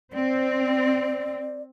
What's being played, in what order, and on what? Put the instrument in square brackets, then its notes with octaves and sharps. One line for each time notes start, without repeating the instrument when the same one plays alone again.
[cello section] C4 [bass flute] D5